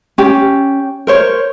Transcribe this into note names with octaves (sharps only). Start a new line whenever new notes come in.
C#4 G4
A#4 C5 C#5